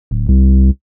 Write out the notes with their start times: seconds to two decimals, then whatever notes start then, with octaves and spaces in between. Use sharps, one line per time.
0.11 D1
0.28 C2